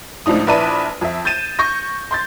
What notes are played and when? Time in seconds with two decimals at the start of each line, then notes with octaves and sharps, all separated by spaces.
0.26 C#2 A2 F3 D4 D#4 D#6
0.47 A#1 E4 B4 D5 A5 D#7
1.01 F2 E5
1.25 G6 A6 D#7 E7
1.59 C#6 G6 A#6
2.11 C6 G6 A6